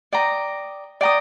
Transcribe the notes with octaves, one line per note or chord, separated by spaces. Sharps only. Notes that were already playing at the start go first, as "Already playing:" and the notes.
D5 G5 A#5 D#6
D5 G5 A#5 D#6